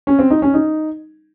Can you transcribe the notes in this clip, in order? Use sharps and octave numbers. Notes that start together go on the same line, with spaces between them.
C#4
C4
D#4
C#4
D#4